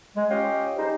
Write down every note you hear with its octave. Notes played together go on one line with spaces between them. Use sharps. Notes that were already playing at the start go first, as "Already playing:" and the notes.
G#3
C#4 F4 G4 D#5 F5 G5
G3 G#3 D#4 C5